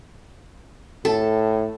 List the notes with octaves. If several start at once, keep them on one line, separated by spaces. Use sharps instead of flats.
A2 A4